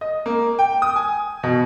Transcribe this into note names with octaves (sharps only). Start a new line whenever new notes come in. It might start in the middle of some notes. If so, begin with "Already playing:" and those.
D#5
A#3
G5
D#6
G#5
B2